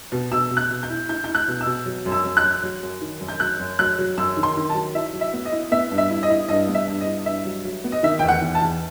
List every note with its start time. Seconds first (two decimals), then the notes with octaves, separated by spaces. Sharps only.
0.12 B2
0.32 B2 E6
0.51 B2
0.57 F#6
0.70 B2
0.83 G6
0.90 E4
1.09 E4 G6
1.24 E4 G6
1.35 F#6
1.48 B2
1.61 E6
1.66 B2
1.86 F#3
2.06 F#2
2.12 E6
2.24 F#2
2.37 F#6
2.43 F#3
2.63 F#3
2.83 F#2
3.01 D#3
3.20 F#2
3.28 G6
3.40 F#3 F#6
3.59 F#2
3.79 F#3 F#6
3.99 F#3
4.17 F#2 E6
4.37 D#3
4.43 C6
4.57 D#3
4.69 A5
4.75 F#3
4.95 E4 E5
5.13 F#3
5.21 E5
5.33 B3
5.45 D#5
5.52 E4
5.72 B3 E5
5.91 G2
5.98 E5
6.10 E4
6.23 D#5
6.30 E4
6.48 G2 D#5
6.68 B3
6.75 E5
6.88 G2
7.01 D#5
7.06 E4
7.26 G2 E5
7.45 F#3
7.65 F#3
7.84 B3
7.92 D#5
8.03 D#3 E5
8.19 E2 G5
8.28 F#5
8.41 E2
8.55 A5
8.61 E2